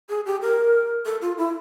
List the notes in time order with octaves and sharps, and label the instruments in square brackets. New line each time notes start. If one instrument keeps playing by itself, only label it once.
[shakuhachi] G#4
G4
A#4
A4
F4
E4